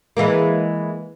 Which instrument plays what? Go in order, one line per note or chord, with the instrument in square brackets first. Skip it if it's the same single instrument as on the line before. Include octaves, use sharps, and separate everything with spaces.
[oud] E3 G#3 A#3